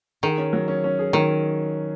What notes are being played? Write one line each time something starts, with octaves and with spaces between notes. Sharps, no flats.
D#3 G#4
C#4
F#3
C#4
C#4
G#4
D#3 F#3